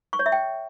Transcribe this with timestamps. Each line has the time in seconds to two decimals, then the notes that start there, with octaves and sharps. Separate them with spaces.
0.13 C#6
0.19 C#5
0.26 E5
0.32 G5